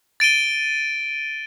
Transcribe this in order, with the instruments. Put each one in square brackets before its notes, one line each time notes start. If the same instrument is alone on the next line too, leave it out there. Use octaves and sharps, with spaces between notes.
[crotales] A6 D7 D#7 G7